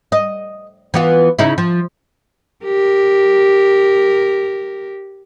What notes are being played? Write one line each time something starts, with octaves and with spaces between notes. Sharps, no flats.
D#5
E3 B3 F4
C#3 D#4 E4
F3
G4 A#4